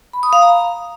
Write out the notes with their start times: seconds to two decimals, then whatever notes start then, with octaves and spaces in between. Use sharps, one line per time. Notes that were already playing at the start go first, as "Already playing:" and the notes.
0.13 B5
0.23 D#6
0.33 F5
0.42 A#5